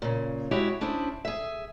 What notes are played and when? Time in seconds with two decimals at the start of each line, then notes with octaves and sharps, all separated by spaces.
0.02 A#2 C#3
0.51 G#3 E4 F#4 G4 C#5
0.81 C#4 D4 E4 G#4 C5
1.25 G#4 E5